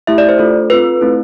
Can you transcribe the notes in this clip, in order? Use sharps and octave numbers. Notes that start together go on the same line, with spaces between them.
A3 E4 G4 E5
D5
C5
A3 D4 F4 A4
C4 F4 A4 B4
A3 C4 E4